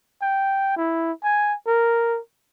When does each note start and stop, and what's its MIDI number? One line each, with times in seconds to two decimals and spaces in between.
0.22 0.75 79
0.77 1.12 64
1.24 1.54 80
1.67 2.19 70